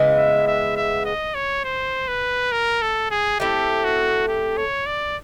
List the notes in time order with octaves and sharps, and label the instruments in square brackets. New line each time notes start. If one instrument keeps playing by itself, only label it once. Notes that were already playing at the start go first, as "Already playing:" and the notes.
Already playing: [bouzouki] C#3 E3 G#3 B3
[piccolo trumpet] E5
E5
E5
D#5
C#5
C5
B4
A#4
A4
G#4
[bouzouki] A3 C4 E4 [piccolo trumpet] G4
[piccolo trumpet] F#4
G4
C#5
D5